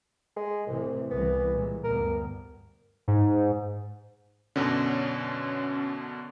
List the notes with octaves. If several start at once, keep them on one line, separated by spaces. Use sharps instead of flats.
G#3
C2 A2 C3 E3
C2 E3 B3
A#2 G#3
D2 G2 B3 A#4
G#2
F#2 B2 D3 C#4